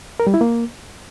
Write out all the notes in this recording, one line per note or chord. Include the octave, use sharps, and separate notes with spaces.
A#4
G3
E4
A#3